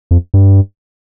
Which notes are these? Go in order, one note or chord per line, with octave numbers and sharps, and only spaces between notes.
F2
G2